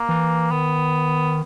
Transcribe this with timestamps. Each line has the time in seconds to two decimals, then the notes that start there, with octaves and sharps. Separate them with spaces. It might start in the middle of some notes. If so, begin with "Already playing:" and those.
Already playing: A#3
0.09 E3
0.52 D#3 B3